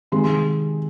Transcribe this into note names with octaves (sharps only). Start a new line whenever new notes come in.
C3 D#3 G#3 C6